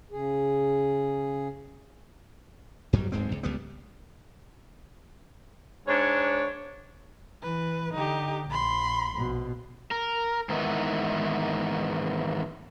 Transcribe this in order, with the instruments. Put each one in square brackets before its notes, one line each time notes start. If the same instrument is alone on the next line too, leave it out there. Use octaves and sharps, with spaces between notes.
[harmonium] C#3 G#4
[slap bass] G2 F#3 G3
D1 G#2 G#3 C4
C#2
C#2 G3 B3
[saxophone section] G#2 D4 C#5
[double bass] E3 [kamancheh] B4
[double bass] D3 [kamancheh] D#4 G4
[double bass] A#1 [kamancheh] B5 C6
[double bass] A#1 B2
[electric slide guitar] A#4
G#2 D#3 E3 B3 D#4